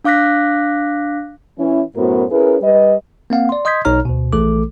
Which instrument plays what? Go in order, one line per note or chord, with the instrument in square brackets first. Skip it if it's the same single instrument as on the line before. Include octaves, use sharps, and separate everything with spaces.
[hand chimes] D4 F5 D6 F#6 A#6 B6
[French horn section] E3 C#4 E4
F#2 A2 B3 F#4 A#4 C5
C#4 E4 G#4 A#4 B4
G3 B4 D#5
[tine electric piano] A#3 C4 F5 F#5
D5 C6
D#5 C6 D#6 G6 G#6 B6
B1 B2 D#4 C#5 A#5 F6
D2 B2
A#1 E3 A3 A4 D6